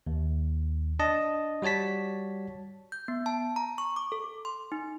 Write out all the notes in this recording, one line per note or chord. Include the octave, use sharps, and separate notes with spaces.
D#2
D4 D#5 A5
G3 F#4 C#5 A5 B6
G6
B3
A5
A#5
C#6
D6
A4
C6
D#4